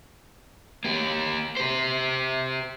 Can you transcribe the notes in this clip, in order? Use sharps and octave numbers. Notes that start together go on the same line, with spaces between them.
A#3 G4
G4 C5